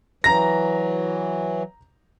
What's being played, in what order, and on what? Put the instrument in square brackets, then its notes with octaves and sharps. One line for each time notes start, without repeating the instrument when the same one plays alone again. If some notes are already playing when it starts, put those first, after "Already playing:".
[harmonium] E3 F#3 [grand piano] A#5 A#6